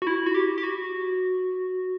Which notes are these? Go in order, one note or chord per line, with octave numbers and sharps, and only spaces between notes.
F#4
E4
F#4
G4
G4
F#4